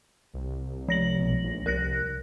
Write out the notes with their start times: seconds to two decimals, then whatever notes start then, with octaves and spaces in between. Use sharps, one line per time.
0.34 C2
0.88 F3 A#6 F#7
1.18 B1
1.43 A#1
1.66 C2 A#4 F#6 A#6